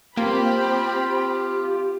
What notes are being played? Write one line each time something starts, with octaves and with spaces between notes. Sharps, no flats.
A#3 C4 F4 G4 B5